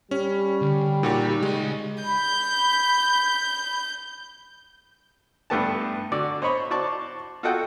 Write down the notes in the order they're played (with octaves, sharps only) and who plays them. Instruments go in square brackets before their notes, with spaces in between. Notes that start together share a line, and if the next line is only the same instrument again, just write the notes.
[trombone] G3 [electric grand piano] C#4
[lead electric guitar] D3
[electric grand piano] A#2 F#4 G4 [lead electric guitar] D#4
[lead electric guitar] C#2 D#5 [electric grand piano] G#3
[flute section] B5 [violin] G6
[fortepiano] G2 G3 A3 B3 G4 A5
D3 F#4 D5
C5 C#5 D#5 B5 C#6
F#4 C5 D5 A5 C#6 D6
F4 F#4 A4 D#5 F#5 G5